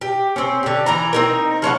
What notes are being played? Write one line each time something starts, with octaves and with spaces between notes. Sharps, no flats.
G4
C4 C#4
D3 G4
E3 D5 A#5
C4 D#4 A#4
F3 C#4 E4 F#5